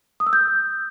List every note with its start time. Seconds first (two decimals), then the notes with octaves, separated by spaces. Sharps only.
0.20 D#6
0.27 E6
0.33 G6